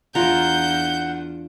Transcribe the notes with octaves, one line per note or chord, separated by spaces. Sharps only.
E2 E3 D4 F4 F#5 A#5 G6